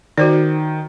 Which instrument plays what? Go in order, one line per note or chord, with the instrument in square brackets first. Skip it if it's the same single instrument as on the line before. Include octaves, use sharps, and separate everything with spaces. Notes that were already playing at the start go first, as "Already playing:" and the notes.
[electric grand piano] D#3 [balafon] F#4 C5 D5